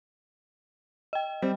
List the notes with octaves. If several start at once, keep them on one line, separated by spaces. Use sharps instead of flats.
D#5 G5
G3 C4